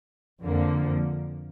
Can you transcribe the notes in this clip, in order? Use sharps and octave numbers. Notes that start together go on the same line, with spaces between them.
F2 D3 F3 A#3